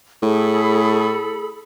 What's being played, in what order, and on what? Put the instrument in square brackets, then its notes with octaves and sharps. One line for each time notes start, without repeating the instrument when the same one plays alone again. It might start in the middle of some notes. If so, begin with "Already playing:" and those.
[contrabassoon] A2 [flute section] G#4 A4 B5